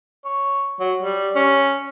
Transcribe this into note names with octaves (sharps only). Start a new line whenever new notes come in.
C#5
F#3
G3
C#4